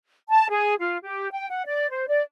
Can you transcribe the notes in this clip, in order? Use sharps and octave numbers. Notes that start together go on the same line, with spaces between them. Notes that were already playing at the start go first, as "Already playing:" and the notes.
A5
G#4
F4
G4
G5
F#5
D5
C5
D5